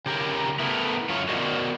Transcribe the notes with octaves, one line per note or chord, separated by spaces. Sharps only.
C#3 G4 A#4
A3 B3 E4 A#4
F#2 F4 C#5
B3 F#4 A#4 C5 D5 D#5